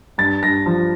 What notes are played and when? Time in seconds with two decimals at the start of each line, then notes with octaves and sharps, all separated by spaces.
0.18 G2 A6
0.43 G2 A#6
0.66 F3